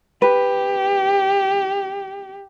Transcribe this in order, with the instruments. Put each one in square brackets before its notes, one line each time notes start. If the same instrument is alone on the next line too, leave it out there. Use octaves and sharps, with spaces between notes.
[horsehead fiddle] G4 [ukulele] B4